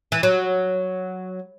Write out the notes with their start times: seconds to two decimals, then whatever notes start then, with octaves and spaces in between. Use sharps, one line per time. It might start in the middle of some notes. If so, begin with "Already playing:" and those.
0.12 E3
0.23 F#3